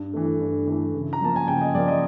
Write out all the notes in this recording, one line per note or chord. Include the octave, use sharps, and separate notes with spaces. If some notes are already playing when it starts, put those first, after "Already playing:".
Already playing: G2
E3 A3
G2
E3 A3
C#3
A#5
F3 A#3 A5
G#5
C#3 G5
D#5
F3 A#3 D5
D#5